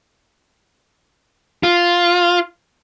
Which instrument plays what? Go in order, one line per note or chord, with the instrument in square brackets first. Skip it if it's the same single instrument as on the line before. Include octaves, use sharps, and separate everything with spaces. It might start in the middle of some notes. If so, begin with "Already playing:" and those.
[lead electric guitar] F4